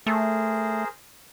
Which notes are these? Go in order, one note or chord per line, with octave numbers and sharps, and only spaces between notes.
A3 G#4 A#4 C5